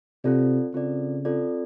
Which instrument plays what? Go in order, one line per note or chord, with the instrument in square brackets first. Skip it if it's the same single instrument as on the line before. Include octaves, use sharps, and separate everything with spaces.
[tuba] C3 [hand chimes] C4 F4 A4 D5
[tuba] C#3 [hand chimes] C4 F4 A4 D5
[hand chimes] C4 F4 A4 D5